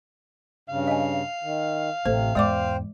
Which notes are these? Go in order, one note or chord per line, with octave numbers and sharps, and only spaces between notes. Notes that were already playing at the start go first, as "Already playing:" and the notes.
G2 C#3 F5
D#5 G#5
D#3
A1 C3 A4 C5
E2 G#2 G#3 C5 D5 G5 D6